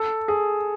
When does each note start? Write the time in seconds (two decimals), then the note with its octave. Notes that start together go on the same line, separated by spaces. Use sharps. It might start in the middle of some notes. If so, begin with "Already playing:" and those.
Already playing: A4
0.28 G#4